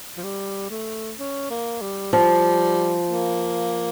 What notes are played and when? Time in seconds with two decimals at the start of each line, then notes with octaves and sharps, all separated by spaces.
0.17 F3
0.23 G3
0.70 A3
1.18 C#4
1.50 A#3
1.81 G3
2.13 F3 G3
3.08 A#3